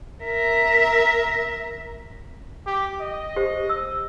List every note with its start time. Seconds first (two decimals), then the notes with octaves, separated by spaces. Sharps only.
0.24 A#4 E5
2.66 G4
3.00 D#5
3.36 G4 C5
3.69 E6